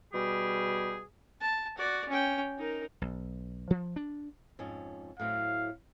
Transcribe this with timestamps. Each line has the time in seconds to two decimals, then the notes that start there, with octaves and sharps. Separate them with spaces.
0.13 B2 G3 G4 G#4
1.41 A5
1.78 F#4 D5
2.09 C#4 G5
2.58 D#4 A#4
3.02 B1
3.70 F3
3.96 D4
4.59 F2 G#2 C#4
5.20 A2 F#3 C4 F5